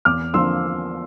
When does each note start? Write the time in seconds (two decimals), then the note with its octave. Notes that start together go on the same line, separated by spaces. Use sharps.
0.05 E2 D6 F6
0.33 D3 F3 A#3 C6 E6